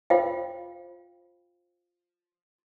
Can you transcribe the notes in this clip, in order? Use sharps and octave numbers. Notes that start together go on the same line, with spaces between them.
F4 C5 F5 G5